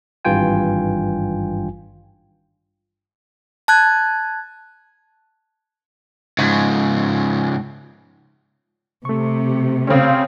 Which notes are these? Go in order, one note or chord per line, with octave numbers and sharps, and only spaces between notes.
G#1 G2 E3 F4 G5 G#5
A5 F#6 G#6
G#2 C#3 F3
C3 A3 C#6
C#3 C4 C#4